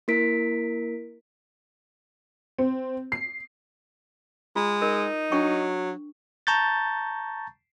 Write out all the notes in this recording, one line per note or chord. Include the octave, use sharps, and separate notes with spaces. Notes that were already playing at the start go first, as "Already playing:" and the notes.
A#3 E4 A#4 B6 D7
C4
C7
G#3 F4
D#4 A#4
F#3 D4 G5 C#6
A5 A#5 C#6 G6 A6